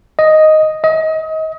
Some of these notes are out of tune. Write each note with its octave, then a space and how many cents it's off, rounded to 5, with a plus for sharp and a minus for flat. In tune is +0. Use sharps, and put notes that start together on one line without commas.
D#5 +0
D#5 +30